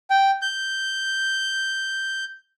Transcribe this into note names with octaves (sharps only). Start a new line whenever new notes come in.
G5
G6